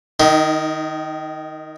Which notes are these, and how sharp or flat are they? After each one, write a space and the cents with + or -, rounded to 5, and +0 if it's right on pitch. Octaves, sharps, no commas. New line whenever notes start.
D#3 -10 D#4 +25